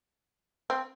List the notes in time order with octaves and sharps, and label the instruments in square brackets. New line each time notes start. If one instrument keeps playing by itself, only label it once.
[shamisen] C4